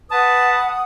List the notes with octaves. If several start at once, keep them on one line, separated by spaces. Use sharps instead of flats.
B4 F#5 A5 D#6